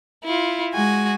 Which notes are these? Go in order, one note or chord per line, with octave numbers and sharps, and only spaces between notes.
E4 F4
G#3 F#4 G#5